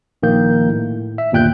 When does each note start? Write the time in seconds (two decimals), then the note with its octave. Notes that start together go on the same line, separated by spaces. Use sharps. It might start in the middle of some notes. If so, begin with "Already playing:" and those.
0.23 A#1 D#3 A#3 G6
0.69 A2
1.18 E5
1.32 G1 D#2 A#2 G5 F#6 G6